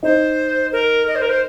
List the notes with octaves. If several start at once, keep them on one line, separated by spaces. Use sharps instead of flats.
D#4 C5
A#4
D#5
C5
A#4
C5